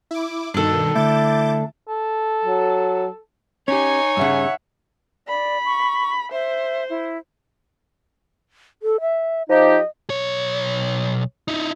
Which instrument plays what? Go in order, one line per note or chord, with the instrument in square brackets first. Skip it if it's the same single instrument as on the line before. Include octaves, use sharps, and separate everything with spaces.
[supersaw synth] E4 D6
[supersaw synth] G2 B2 D#3 [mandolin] D4 A4
[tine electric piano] D3 A3 [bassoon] E4 [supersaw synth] D6 G6 A6
[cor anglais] A4
[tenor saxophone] F#3
[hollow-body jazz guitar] C#4 G4 [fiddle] D#4 G#5 [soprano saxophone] C#5
[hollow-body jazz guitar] G2 C#3 [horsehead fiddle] E5 F#5
[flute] D5 [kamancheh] B5
[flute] C#6
[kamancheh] C5 [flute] E5
[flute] E4
[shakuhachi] A4
E5
[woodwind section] F3 D#4 G4 [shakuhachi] D#5
[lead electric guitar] B1 C#5
D#4 E4